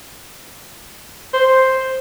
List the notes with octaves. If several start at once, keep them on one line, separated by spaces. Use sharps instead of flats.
C5